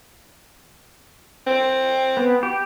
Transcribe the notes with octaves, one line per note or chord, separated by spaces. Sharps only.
C4
B3
G4